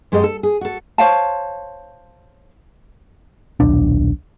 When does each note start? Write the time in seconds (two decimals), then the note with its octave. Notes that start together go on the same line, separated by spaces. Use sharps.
0.12 F#2 G#3 G4 A4 D#5
0.24 A4
0.43 G#4
0.61 F#4 A4
0.98 C5 C#5 F5 A5
3.60 D#1 B1 D4